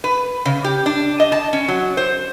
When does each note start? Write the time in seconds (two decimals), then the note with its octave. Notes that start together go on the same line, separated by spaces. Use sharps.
0.04 B4
0.45 C#3
0.64 G4
0.86 D4
1.20 D#5
1.32 A5
1.53 C#4
1.68 F#3
1.97 C5